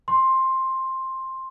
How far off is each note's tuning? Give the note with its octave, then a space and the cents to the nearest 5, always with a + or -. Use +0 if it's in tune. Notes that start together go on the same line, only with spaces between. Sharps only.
C6 +10